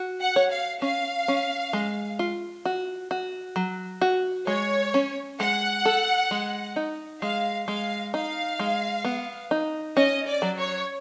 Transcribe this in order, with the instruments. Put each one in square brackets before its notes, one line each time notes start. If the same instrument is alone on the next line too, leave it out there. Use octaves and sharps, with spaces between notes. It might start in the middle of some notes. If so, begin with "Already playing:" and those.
Already playing: [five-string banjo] F#4
[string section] F#5
[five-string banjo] C#5
[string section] F5
[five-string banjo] C#4 [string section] F5
[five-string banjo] C#4
G#3
F4
F#4
F#4
F#3
F#4
[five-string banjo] G#3 [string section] C#5
[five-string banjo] C#4
[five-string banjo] G#3 [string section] F#5
[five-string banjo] A4
G#3
D#4
[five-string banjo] G#3 [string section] F5
[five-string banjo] G#3 [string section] F5
[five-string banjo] D#4 [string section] F5
[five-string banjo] G#3
B3
D#4
[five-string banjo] C#4 [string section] D#5
[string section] D5
[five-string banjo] F#3
[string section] C#5